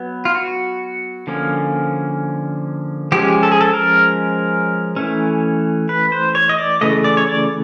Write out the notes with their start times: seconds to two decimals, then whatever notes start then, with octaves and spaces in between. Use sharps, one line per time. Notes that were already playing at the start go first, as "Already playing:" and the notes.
Already playing: F#3 B3
0.25 F4
0.35 F#4
1.27 D3 F3 A#3 C#4
3.12 F3 G#3 C#4 G4
3.43 A4
3.52 G#4
3.61 A4
3.73 A#4
4.96 E3 A3 C#4
5.89 B4
6.12 C5
6.35 C#5
6.49 D#5
6.58 D5
6.81 C#3 E3 A3 D#5
7.04 D5
7.17 C#5
7.28 D5